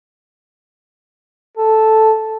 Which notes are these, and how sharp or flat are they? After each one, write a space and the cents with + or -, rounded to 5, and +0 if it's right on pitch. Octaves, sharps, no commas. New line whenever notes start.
A4 -5